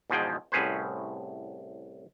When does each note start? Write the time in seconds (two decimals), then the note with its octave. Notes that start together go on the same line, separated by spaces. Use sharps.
0.10 E2 G#2 B2 F3 G#4 G5
0.52 C2 A2 C#4 G#4 B4 C5